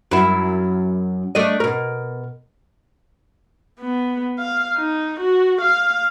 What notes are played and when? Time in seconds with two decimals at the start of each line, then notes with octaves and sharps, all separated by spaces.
0.11 F#2 E4
1.35 A3 D4 D#5
1.60 B2 A#4
3.80 B3
4.39 F5
4.77 D#4
5.20 F#4
5.61 F5